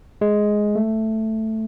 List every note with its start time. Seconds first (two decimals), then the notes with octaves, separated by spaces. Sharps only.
0.21 G#3
0.75 A3